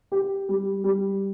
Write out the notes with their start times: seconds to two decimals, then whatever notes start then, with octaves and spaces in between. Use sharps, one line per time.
0.12 G4
0.49 G3
0.84 G3